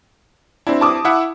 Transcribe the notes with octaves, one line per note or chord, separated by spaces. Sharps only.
C4 D4 E4
A5 D6 D#6
E4 E5 F#5